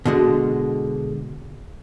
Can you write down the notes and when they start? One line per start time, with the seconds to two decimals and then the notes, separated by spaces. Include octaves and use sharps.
0.05 B2 D3 G#3